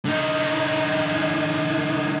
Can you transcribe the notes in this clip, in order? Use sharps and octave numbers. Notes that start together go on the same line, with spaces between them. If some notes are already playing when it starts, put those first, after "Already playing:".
D3 D#4